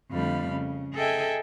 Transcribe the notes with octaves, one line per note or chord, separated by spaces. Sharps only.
F2 D3 G3 A3 F5 B5
C#3
G#4 A4 D#5 E5 G5 G#5